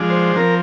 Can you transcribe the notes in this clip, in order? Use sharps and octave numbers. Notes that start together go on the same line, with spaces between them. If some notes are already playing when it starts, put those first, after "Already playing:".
Already playing: F3 G#3 D4
C5
F3 C4 A#4